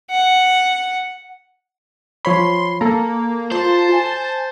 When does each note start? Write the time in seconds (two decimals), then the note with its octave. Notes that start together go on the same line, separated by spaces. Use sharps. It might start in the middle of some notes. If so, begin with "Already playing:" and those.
0.11 F#5
2.25 F3 C#5 B5 C6
2.81 A#3 A4 A#5
3.52 F4 C5 A5
3.91 G#5